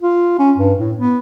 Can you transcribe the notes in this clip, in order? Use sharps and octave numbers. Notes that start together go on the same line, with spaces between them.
F4
C#4
G2
A2
B3